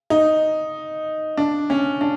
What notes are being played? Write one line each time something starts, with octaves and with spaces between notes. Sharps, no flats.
D#4
D4
C#4
D4